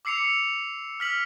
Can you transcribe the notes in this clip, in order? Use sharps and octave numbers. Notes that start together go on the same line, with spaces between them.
D6 E6 C7 C#7 F7
F6 B6 F#7